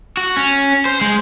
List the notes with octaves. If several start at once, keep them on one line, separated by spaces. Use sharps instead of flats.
F#4
C#4
C5
G#3